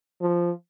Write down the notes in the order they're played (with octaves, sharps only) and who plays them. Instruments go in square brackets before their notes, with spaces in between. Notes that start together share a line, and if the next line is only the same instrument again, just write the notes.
[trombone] F3